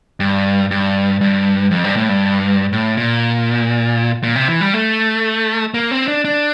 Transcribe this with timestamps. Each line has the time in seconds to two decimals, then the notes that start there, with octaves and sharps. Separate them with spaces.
0.20 G2
0.71 G2
1.21 G2
1.71 F2
1.84 G2
1.96 A2
2.09 G2
2.72 A2
2.97 A#2
4.23 A#2
4.36 C3
4.48 E3
4.61 G3
4.74 A3
5.74 A#3
5.91 C4
6.08 D4
6.25 D4